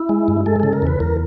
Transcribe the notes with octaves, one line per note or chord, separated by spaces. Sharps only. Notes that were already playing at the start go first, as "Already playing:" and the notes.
Already playing: E4
G#3
G2
G#3 A4
C#3 A4
A#4
E2 B4
E2 A#4